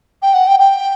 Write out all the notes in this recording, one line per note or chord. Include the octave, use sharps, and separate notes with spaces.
G5
F#5
G5
G5